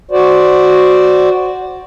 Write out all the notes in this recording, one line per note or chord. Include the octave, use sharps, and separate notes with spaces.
F#4 C5 D5